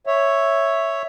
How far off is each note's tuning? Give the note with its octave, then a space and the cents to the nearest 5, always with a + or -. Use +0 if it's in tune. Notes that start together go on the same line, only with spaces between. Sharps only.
C#5 +0 E5 +0